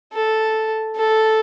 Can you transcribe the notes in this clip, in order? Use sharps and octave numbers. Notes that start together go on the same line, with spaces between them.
A4
A4